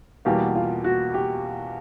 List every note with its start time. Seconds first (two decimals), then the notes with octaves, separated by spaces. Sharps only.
0.25 E2 B2 G3 A#3 G4
0.55 F4
0.84 F#4
1.14 G4